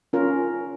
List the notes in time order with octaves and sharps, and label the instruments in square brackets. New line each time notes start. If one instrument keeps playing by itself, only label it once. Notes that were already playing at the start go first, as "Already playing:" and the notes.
[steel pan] C#4 F4 A#4